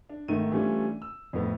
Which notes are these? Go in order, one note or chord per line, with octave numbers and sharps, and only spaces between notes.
D4
G#1 D#3 A3 A#4 D#7
E3 G3 A3 C#4 D4 F4
E6
F2 A2 B3